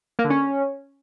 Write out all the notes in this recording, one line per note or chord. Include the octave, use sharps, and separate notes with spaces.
A#3
D3
C#4